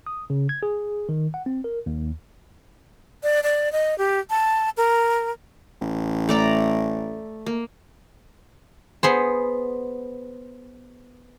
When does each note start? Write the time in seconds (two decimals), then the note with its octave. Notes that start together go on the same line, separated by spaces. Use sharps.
0.07 D#6
0.30 C#3
0.49 G#6
0.63 G#4
1.09 D#3
1.34 F#5
1.46 C4
1.64 A#4
1.86 D#2
3.23 D5
3.43 D5
3.72 D#5
3.98 G4
4.30 A5
4.77 A#4
5.81 A1
6.29 A3 D5 A#5
7.46 A#3
9.03 B3 G#4 C5